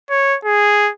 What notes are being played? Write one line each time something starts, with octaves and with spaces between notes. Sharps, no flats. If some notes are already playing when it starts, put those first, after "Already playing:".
C#5
G#4